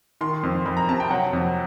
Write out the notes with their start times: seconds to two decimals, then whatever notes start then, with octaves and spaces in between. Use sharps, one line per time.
0.21 D#3 C6
0.43 F2
0.66 F2 B5
0.77 A#5
0.89 C3 A5
1.00 G5
1.10 F#3 F#5
1.33 F2